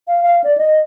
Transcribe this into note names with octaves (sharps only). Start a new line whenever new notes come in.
F5
F5
D5
D#5